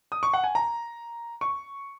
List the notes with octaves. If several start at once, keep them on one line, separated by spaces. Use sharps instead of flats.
D#6
C#6
F#5
G#5
A#5
C#6